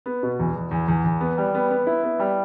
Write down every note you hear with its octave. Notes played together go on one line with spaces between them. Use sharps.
B3
B2
E2
E2
E2
E2
E2
B3
G3
B3
B3
E4
B3
G3